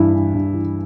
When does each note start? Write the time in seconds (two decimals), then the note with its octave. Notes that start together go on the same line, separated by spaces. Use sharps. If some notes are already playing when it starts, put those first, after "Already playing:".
Already playing: G2 E3 E4
0.14 E3
0.34 G2
0.54 E3